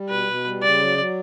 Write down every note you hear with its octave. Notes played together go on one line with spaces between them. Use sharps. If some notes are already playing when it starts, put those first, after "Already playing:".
Already playing: G3
B2 B4
B2
G3
C#3 D5
F#3
F#3